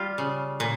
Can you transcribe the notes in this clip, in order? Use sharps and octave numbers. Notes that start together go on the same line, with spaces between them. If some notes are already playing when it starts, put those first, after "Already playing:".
Already playing: G3 F4
C#3
A#2